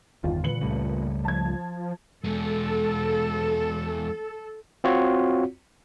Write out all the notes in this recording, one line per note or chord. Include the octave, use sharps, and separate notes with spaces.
G1 E2 D#3 F4
A#2 D3 E3 G#3 B4 C#7 F#7
C#2 G2 C#3 G3 A3
F3 A5 G#6
E2 G#3 A4
C4 F4 F#4 C#5